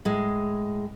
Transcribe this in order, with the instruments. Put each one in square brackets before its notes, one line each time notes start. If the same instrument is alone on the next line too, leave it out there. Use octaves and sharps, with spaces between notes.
[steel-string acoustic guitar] A2 G#3